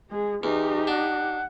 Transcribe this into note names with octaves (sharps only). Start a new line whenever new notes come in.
G#3 G#4
E2 D#4 G4
D4 F#5